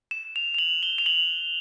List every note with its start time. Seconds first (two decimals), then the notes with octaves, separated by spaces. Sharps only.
0.11 E7
0.36 F7
0.54 F7
0.59 F#7
0.83 G7
0.98 F7
1.06 F#7